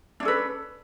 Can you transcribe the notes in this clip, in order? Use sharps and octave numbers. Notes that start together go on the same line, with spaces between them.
C#4 D4 A4 B4